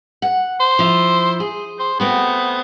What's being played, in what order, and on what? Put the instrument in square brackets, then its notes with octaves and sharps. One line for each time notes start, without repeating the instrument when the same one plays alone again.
[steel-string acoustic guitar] F#5
[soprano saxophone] C5
[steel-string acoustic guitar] F3 E4
G#4
[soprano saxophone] C5
[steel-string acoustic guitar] A3 C4 F#4 [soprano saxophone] B3